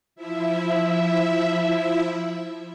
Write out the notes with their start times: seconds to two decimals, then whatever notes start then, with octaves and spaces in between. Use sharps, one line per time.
0.15 F3 E4 E5